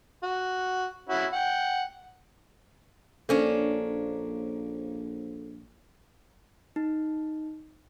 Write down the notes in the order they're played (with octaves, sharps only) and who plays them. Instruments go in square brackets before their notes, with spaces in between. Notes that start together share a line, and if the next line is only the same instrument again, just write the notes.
[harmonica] F#4
C#4 E4 F#4
F#5 G5
[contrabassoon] A#1 [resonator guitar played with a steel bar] A#3 C#4 D4 [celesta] A4 C5 C#5
[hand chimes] D#4